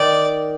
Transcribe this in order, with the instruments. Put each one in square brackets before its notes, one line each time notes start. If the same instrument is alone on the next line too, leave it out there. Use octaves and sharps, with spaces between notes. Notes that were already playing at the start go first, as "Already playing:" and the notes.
Already playing: [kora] D#3 [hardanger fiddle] D5